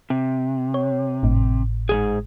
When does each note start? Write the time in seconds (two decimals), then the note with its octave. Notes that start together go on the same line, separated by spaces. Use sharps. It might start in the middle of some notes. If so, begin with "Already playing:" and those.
0.10 C3
0.74 C#5
1.23 G#1 A2
1.89 G#2 F3 G#4